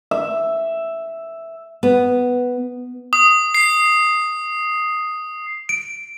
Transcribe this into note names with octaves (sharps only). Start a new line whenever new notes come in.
E5
B3
D#6
C7
D7